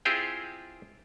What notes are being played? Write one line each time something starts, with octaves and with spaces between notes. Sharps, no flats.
C4 E4 F4 G4 G#4 C5